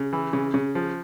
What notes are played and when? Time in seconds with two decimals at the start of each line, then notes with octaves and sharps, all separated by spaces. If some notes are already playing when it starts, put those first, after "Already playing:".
Already playing: C#3
0.13 E3
0.33 C#3
0.54 C#3
0.75 F3